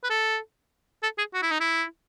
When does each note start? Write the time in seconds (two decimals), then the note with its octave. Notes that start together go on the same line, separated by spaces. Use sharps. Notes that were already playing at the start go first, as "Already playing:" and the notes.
0.04 B4
0.10 A4
1.03 A4
1.18 G#4
1.34 F#4
1.42 E4
1.51 D#4
1.60 E4